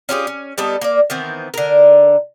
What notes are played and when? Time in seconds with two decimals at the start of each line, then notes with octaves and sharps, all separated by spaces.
0.09 C#4 F4 G4 G#4
0.27 C#4
0.58 G3 B3 D#4 A4
0.81 A#3 D5
1.10 D#3 E3 B3 C4
1.54 D3 A#4